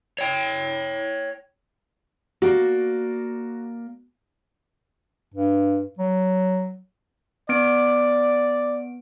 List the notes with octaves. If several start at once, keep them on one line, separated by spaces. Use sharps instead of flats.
C#5 G5
A#3 F#4 D5
G2
F#3
B3 D5 D7